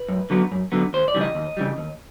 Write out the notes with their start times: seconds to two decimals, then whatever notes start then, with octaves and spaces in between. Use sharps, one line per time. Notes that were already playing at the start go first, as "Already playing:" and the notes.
Already playing: B4
0.09 F#2
0.30 D3 F#3 B3
0.52 F#2
0.72 D3 F#3 B3
0.93 D#2 C5
1.08 D5
1.14 C#3 E3 G3
1.21 D#5
1.35 D#2
1.57 C#3 E3 G3
1.78 D#2